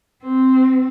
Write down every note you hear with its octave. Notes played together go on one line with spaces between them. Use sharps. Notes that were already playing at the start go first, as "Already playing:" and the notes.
C4